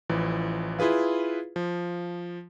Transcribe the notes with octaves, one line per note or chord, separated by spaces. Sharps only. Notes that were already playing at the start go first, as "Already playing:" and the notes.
A1 E3 F3
E4 F4 G#4 B4 F5
F3